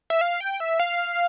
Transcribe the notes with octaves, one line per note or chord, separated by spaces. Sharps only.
E5
F5
G5
E5
F5